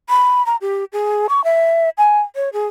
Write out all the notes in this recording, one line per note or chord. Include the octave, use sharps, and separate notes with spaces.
B5
A#5
G4
G#4
C#6
E5
G#5
C#5
G#4